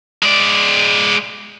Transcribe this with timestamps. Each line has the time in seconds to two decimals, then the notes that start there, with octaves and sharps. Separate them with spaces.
0.23 G#3 D5